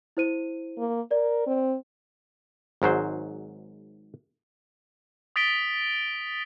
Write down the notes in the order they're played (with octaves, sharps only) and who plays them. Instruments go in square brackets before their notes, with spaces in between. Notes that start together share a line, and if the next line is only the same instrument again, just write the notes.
[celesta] E4 C5 D#7
[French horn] A#3
[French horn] A#4 [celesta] D5
[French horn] C4
[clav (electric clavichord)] G#1 G#2 F#3 C5
[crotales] D#6 A6 B6 D7 G7